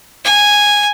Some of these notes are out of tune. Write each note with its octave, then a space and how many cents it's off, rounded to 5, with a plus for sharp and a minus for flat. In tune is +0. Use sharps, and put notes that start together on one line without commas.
G#5 -5